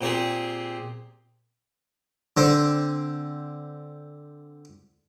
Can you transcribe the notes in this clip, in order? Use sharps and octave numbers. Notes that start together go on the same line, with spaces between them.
A#2 C4 G4 G#4
D3 C4